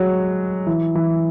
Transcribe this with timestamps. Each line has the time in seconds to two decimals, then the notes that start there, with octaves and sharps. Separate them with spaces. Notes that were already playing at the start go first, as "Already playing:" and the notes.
Already playing: F#3 G#3
0.67 E3
0.95 E3